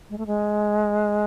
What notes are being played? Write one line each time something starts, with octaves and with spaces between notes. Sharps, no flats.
G#3
A3
G#3